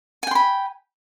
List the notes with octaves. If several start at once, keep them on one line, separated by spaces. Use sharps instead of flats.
G5 G#5 B5 C6